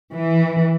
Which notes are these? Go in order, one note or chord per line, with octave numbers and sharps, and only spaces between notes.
E3